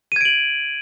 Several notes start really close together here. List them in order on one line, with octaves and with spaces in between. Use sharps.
D#7 G#6 D7 F#7